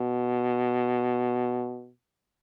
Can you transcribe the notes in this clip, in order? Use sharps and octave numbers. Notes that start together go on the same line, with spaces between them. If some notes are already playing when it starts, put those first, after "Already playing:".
Already playing: B2